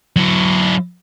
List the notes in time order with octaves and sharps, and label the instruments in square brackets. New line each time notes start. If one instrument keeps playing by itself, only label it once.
[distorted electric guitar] F#3 E4